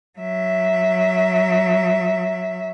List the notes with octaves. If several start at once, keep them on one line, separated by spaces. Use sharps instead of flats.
F#3 E5